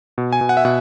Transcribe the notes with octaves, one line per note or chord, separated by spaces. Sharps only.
B2
G#5
B2
F#5
E5
B2 F#5